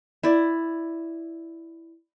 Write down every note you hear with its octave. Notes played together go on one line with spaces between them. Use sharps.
E4 D5